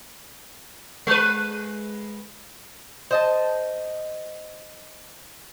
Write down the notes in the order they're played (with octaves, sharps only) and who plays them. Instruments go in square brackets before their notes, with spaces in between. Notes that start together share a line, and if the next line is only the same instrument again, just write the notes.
[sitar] G#3 B4
[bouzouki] C5 D#5 A5